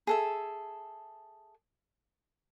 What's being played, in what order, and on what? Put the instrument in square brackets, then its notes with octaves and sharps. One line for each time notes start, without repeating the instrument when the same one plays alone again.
[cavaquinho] G#4 A4 E5